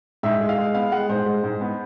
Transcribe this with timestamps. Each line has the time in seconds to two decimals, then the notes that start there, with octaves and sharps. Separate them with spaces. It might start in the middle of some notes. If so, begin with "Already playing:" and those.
0.23 G#2 E5
0.40 G#3
0.49 F5
0.58 G#3
0.74 B3 F5
0.92 G#3 F#5
1.09 G#2 C5
1.26 G#3
1.44 G#2
1.61 B3